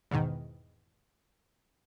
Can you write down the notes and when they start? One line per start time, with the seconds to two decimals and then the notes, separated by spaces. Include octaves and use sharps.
0.11 E2 G#2 B2 D#3